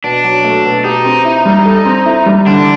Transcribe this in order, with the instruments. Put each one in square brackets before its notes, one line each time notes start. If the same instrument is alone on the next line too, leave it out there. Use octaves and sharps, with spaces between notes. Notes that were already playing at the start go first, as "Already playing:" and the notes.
[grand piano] B2 [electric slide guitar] D4
[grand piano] F#3
A3
B2
[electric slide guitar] D#4 [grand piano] G4
[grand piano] C4
E4
G3
A4
C4
E4
G3
[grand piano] D3 [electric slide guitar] D4